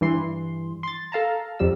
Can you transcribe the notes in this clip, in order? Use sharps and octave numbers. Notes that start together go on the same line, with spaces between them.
G2 E3 C6
C6 A6
A4 F5 A5 A#5
F2 F3 G3 E6